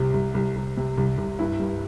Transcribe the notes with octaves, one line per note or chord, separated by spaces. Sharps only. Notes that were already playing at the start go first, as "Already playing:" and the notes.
Already playing: C2 C3
C2
C2
C2
C3
C2
C2
G2 E4
G2